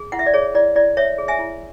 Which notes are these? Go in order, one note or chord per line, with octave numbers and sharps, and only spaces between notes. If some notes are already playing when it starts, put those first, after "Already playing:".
Already playing: G#4
E4 F#5
E5
D5
G#4 C#5
E4 D5
E4 D5
C#5 E5
G#4
E5 G#5
E4